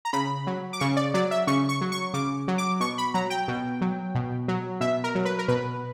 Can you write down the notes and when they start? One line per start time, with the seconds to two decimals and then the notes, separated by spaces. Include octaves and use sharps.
0.05 A#5
0.13 C#3 B5
0.47 F#3
0.73 D6
0.80 C#3 C#6
0.97 D5
1.14 F#3 D5
1.31 E5
1.47 C#3 C#6
1.69 C#6
1.81 F#3
1.92 C#6
2.14 C#3 D6
2.48 F#3
2.58 D6
2.80 B2 C#6
2.98 B5
3.14 F#3 A#5
3.30 G5
3.48 B2
3.81 F#3
4.15 B2
4.48 F#3
4.81 B2 E5
5.04 A#4
5.15 F#3
5.25 B4
5.39 A#4
5.48 B2 B4